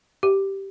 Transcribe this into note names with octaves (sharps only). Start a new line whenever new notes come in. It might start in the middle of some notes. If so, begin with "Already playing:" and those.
G4